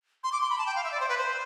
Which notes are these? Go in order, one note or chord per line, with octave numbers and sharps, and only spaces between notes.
C6
D6
C6
B5
A5
G5
F5
E5
D5
C5
B4
C5